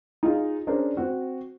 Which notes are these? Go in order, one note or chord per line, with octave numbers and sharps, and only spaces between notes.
D#4 F4 G#4
C#4 D4 G#4 A#4 C5
C4 F#4